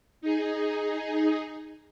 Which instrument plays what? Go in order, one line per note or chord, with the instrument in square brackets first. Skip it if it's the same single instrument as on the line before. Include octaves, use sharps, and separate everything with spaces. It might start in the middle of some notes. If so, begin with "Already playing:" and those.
[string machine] D#4 G#4